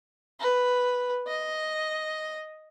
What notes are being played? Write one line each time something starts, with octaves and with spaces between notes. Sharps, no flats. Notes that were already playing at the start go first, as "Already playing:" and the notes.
B4
D#5